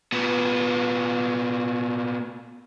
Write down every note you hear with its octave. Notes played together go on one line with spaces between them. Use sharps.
A#2 B3